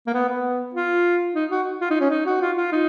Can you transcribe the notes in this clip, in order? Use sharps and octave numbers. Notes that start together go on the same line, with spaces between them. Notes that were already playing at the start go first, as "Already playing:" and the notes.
A#3
B3
B3
F4
D#4
F#4
F4
D#4
C#4
D#4
F#4
F4
F4
D#4